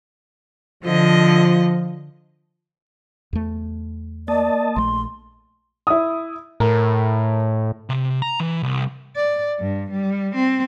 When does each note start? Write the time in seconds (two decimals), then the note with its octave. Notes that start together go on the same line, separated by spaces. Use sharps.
0.84 D3 F3 D#5
3.33 E2 A3
4.28 A#3 D5 D#5 A5
4.76 A#1 A3 C6
5.87 E4 D#6
6.60 A2 A#4
7.89 C3
8.22 A#5
8.40 E3
8.63 C2
9.16 D5
9.60 G2
9.91 G3
10.35 C4